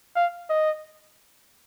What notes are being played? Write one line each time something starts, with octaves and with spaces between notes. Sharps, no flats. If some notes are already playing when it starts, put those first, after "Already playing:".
F5
D#5